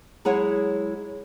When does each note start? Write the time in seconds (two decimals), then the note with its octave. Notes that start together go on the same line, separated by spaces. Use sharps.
0.25 F#3 G#3 E4 G#4 C#5 F#5